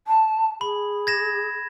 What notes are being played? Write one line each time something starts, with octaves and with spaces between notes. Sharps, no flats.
A5
G#4 B5
G#6 A#6 E7